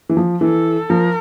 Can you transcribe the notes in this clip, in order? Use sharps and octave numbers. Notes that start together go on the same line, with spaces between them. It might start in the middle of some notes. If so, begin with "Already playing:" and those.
E3
F3
E3 A4
F3 A#4